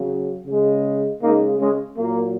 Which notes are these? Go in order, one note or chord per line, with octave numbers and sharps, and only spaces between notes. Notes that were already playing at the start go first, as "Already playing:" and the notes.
Already playing: C#3 F#3
C#3
G#3
C#3 G#3 A#3 D#4
G#3 C#4
A#2 F#3 A#3